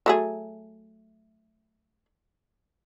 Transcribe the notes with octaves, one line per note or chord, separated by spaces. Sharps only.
F#3 A3 G#4